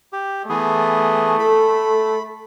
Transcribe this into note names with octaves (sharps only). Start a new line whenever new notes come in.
G4
E3 A3 B3 G#4
A4 B5